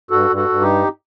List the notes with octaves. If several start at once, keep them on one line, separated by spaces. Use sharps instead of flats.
G2 F#4 A4
G2
F#4 A4
G2
D#4 G4